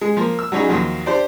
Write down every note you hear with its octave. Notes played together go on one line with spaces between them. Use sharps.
G#3
F3 A#3
E6
F#3 G3 C#4 D#4 G#4
D#2 F3 F#3
D4 G4 C5 D5